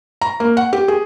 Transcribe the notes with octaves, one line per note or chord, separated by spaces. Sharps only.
A#5
A#3
F#5
G4
G#4